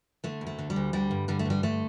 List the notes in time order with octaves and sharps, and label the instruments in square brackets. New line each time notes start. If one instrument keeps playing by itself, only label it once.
[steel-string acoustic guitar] D3 A3
D2
A3
D3
G3
D2
D3 G3
G2
D3 G3
A3
G2 G3
D3 A3